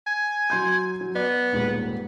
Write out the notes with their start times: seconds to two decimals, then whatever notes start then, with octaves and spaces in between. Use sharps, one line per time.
0.06 G#5
0.50 F#3 C6 G6
1.01 F#3
1.15 B3 D5
1.53 D#1 G#2